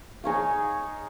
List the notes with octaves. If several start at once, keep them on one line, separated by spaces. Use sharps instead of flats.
D#4 G#4 C#5 F5